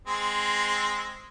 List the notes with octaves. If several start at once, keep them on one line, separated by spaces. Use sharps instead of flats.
G#3 C4